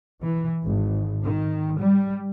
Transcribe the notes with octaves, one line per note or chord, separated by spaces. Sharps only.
E3
G#1
D#3
G3